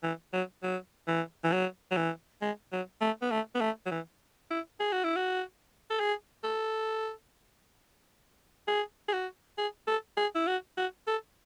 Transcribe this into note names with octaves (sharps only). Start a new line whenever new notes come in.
E3
F#3
F#3
E3
E3
F#3
F#3
E3
G#3
F#3
A3
B3
A3
B3
A3
F#3
E3
E4
G#4
F#4
E4
F#4
A4
G#4
A4
G#4
G#4
F#4
G#4
A4
G#4
E4
F#4
F#4
A4